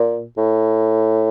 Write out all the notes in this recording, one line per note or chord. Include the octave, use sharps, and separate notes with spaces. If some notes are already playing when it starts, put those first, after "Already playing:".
Already playing: A#2
A2